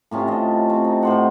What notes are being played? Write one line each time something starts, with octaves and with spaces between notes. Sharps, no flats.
A2 C3 C#4 F4
F4 A4 D#5
C4
D#4
A2 C5 F#5